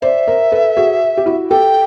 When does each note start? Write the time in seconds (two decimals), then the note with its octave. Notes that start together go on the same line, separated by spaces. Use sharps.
0.02 C5 D5 E5
0.27 A#4 C5
0.52 A4 B4
0.77 F#4 G#4
1.17 G4
1.26 E4 F#4
1.50 G4 A4 G5